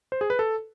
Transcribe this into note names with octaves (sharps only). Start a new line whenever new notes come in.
C5
G#4
B4
A4